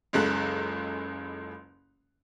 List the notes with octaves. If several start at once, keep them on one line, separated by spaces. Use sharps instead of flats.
F#1 C#2 G#3 A4 F#6